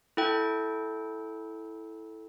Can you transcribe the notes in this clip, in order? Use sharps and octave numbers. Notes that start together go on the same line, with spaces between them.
E4 A4 G5